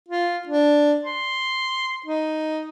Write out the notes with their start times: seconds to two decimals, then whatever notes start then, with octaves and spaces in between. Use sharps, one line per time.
0.08 F4
0.47 D4
1.05 C6
2.06 D#4